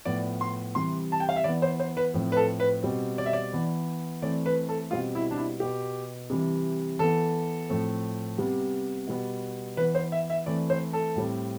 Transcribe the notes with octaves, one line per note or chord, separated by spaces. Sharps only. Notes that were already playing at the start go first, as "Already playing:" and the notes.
A2 F3 B3 D5
C6
C3 E3 G3 C6
A5
G5
F5
E5
E3 B3 D5
C5
C5
B4
A2 F3 C4
B4
A4
B4
B2 G3 C4
D5
E5
D5
E3 B3
E3 A3 C4 D5
B4
A4
B2 G3 C4 F4
E4
D4
E4
B2 B3 G4
C3 E3 G3
E3 B3 A4
A2 F3 A3 C4
C3 G3 B3
B2 G3 B3
E3 B3 B4
C5
E5
E5
E3 A3 C4 D5
C5
A4
A2 G3 C4